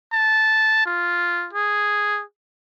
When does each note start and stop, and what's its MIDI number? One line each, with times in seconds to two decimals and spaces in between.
0.13 0.83 81
0.86 1.48 65
1.53 2.22 68